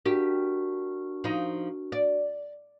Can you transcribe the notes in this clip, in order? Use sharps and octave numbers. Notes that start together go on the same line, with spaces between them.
D4 F#4 G4 A#4
F3 D#4
D5